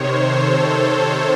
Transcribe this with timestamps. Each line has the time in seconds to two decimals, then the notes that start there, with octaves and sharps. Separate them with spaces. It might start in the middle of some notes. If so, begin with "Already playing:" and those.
Already playing: C3 D#3 C5 C#5
0.18 A4